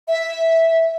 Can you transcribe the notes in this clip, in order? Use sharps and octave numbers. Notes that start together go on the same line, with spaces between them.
E5